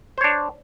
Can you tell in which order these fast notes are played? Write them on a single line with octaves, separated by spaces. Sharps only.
C5 C#5 D4